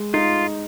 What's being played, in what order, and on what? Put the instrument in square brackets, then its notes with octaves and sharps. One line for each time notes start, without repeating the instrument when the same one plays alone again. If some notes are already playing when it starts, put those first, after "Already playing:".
Already playing: [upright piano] G#3
[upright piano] D#4 [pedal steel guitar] F4